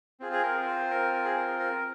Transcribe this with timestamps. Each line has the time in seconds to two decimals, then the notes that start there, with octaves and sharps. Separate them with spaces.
0.20 C4 F4 G#4
0.33 G#4
0.43 A#4
0.61 A#4
0.67 C5
0.90 A#4
1.13 A#4
1.25 G#4
1.37 A#4
1.59 A#4